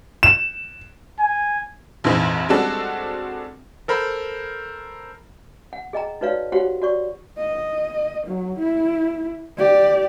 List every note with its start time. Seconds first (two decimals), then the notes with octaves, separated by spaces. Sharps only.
0.23 E7
1.19 G#5
2.04 A#1 F2 G#2 E3
2.49 G3 G#3 C4 D4 F#4 A4
3.88 A4 A#4 C5 B5
5.73 F#5
5.93 G#4 D#5 G5 A#5
6.21 D#4 F#4 B4 C#5 D5 F5
6.52 F#4 G4 C5 C#5 F5 F#5
6.82 F#4 D5 C#6
7.38 D#5
8.26 F#3
8.59 E4
9.58 G4 D5